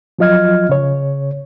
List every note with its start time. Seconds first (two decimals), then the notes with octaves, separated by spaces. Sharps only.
0.19 F3 F#3 F4 D#5 F6 G#6
0.69 C#3 C#5